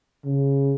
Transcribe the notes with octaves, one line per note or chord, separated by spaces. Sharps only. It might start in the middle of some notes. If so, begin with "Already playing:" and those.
C#3